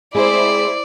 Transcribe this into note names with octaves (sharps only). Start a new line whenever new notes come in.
G#3 C4 E4 G#4 C5 D5